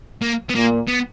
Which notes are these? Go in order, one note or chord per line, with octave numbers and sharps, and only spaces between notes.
A#3
B3
A#2 A#3
B3